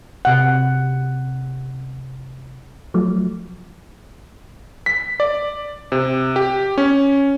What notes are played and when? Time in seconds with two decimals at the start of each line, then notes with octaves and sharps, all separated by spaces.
0.25 C3 F#5
2.94 F3 F#3 A3
4.86 B6
5.20 D5
5.92 C3
6.36 G4
6.78 C#4